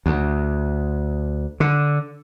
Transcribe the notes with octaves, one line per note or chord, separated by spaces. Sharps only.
D2
D3